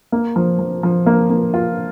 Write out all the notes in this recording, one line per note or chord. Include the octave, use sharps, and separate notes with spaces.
A#3
F3
F3
F3
A#3
A#3
F4